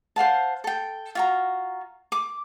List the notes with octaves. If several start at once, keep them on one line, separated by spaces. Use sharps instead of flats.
C5 F5 F#5 A5
A4 G5
F4 F#4 A#5
D6